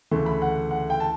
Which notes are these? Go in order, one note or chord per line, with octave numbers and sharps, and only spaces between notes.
D2 C#3 E3 A3
B5
F#5
F#5
G5
A5